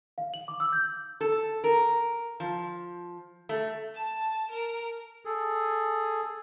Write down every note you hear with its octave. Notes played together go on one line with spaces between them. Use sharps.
F5
F#7
D6
E6
G6
A4
A#4
F3
A3
A5
A#4
G#4 A4